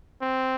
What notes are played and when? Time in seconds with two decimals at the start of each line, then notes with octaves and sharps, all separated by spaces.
0.21 C4